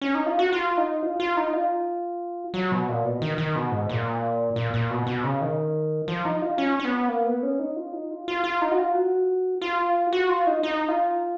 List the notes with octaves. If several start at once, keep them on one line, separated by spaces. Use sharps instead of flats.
C#4
D#4
F4
F#4
F4
D#4
F4
F4
D#4
F4
F#3
B2
A#2
B2
D#3
D#3
B2
G#2
A#2
A#2
A#2
B2
B2
C#3
D#3
F3
D#4
F4
C#4
C#4
B3
A#3
B3
C#4
D#4
F4
D#4
F4
F4
F4
D#4
F#4
F4
F#4
F4
F#4
F4
D#4
D#4
F4